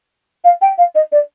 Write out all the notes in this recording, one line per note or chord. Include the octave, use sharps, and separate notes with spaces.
F5
G5
F5
D#5
D5